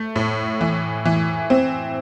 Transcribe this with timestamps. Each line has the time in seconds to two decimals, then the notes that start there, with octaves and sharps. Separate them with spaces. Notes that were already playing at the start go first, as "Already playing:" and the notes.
Already playing: A3
0.16 A2
0.61 E3
1.05 E3
1.50 C4